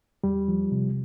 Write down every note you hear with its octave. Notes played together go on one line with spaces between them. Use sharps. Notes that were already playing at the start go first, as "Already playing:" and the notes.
E2 G3
F3
C3